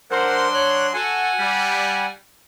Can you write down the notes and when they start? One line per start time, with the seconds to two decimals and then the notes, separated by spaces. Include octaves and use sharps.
0.11 F#3 D4 A#4 C5 F#5 C6
0.54 C#5 F#6
0.94 F#4 A4 F#5 G#5
1.38 G3